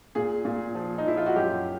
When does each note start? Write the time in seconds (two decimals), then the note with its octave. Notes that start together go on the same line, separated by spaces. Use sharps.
0.15 A#2 G#4
0.45 A#2
0.75 F3
0.98 D#4
1.06 F3 E4
1.17 F4
1.26 F#4
1.36 F#2 G4